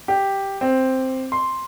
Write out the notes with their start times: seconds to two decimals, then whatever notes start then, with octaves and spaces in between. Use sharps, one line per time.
0.08 G4
0.61 C4
1.32 C6